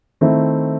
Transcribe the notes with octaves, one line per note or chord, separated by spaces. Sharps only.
D#3 A3 C4 E4